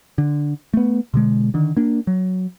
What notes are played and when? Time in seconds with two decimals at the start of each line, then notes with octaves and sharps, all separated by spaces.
0.18 D3
0.74 A3 B3
1.14 B2 D3 G#3
1.54 D3 D#3
1.77 A#3 D4
2.07 F#3